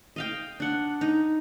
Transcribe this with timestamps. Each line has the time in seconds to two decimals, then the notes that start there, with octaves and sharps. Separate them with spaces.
0.16 D#5 F5 G5
0.60 D4 F#5
1.01 D#4